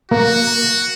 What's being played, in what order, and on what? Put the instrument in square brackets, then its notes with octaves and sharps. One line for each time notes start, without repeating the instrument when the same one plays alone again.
[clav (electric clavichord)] A#3 [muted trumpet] F#4